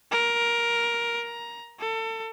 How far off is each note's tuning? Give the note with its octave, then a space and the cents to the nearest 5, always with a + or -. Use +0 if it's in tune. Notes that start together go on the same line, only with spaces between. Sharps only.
A#4 +10
A#5 +15
A4 +30